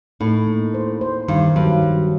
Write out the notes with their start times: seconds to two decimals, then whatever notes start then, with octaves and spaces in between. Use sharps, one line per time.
0.20 A2 D#4
0.47 A#3
0.74 C5
1.01 C5
1.28 G2 D#3
1.56 G2 F#3
1.83 F#3